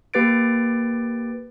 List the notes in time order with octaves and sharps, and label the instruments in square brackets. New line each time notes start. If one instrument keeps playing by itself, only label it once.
[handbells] A#3 G4 B4 A6 D7